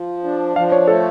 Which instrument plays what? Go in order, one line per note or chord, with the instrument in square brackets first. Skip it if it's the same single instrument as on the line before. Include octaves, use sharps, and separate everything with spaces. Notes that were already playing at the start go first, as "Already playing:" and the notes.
Already playing: [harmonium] F3
D4
[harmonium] F3 [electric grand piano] F5
[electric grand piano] C#5
[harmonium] A3 [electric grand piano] A4